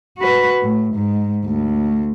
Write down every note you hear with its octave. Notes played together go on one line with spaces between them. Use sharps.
F#4 B4
A2
G#2
D2